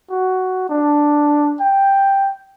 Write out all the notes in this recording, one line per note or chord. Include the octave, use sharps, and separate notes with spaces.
F#4
D4
G5